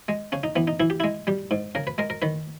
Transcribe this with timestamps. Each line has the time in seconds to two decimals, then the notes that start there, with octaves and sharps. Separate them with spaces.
0.08 G#3
0.32 C#3 C#4
0.43 D#4
0.56 E3 B3
0.67 D#4
0.80 E3 E4
0.90 G4
1.00 G#3 E4
1.27 G3 G4
1.51 G#2
1.75 C#3 A#4
1.87 B4
1.98 G#3 A#4
2.10 A#4
2.22 D#3 B4